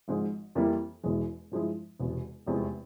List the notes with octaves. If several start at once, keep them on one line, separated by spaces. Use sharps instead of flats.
G#1 G#2 F3 G#3
F2 E3 G3 A#3 E4
E1 E2 E3 G#3
G2 F3 G#3 E4
E1 E2 C3
F1 E2 C3 F3 G#3